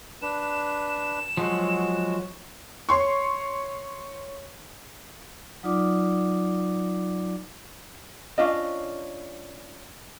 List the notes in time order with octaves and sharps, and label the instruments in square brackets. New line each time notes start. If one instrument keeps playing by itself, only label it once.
[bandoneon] D4 B4 [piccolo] E7
[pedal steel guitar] F3 F#3 [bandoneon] G#3 F#4
[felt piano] C#5 C6 C#6
[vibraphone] F#3 D#4 F4 D5 D6
[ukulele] C#4 D4 F4 D#5